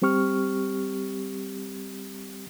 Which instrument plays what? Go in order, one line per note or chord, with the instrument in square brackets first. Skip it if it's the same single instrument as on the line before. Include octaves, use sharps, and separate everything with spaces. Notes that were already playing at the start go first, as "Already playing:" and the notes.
[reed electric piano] G3 C4 G4 C#6 F6